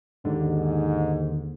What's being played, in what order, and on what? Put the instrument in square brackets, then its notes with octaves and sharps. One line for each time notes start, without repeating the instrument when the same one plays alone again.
[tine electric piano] D#2 D3 [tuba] G#2